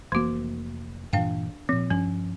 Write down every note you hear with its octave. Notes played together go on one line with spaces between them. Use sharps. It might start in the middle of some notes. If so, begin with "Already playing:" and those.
F1 E3 A#3 F#4
G2 A#2 E3 D4 F5 G5
A#2 F3 C4
G2 F3 C#4